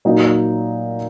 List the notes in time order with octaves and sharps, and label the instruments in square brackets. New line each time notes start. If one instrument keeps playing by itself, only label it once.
[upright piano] A#2 F#3 A#3 D#4